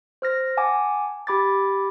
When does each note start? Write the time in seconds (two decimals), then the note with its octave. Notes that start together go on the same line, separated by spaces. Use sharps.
0.22 C5 F6 A#6
0.57 F#5 G#5 A5 D6
1.27 G4 B5 D6 G#6 A6